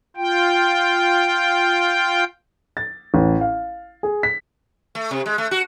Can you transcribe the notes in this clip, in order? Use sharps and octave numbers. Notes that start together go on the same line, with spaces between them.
F4 G5
A6
A1
F5
G#4
B6
A3
C3
G#3
A3
F#4